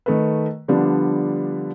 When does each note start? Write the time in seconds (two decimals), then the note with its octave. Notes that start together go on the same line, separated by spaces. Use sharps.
0.06 D#3 A3 B4
0.68 D3 F3 G3 B3 D4